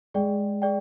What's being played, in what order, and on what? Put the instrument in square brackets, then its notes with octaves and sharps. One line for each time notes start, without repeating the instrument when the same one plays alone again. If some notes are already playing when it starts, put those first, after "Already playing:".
[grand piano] G#3 [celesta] G#4 D5 G5
[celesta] G#4 D5 G5